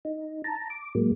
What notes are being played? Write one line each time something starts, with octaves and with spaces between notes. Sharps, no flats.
D#4
A5 A#5
D6
A2 F#3 G#3 A#3